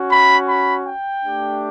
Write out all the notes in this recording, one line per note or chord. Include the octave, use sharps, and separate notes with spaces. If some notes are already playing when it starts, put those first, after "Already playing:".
Already playing: C#4 F#4
B5
B5
G5
A3 D4 G4